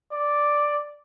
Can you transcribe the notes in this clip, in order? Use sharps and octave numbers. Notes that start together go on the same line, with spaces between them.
D5